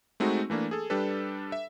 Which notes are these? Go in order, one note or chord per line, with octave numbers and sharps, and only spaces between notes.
G#3 A3 C4 D#4 F#4
E3 A3 A#3 D4
G#4 A4
G3 D4 G4 A4 B4
E5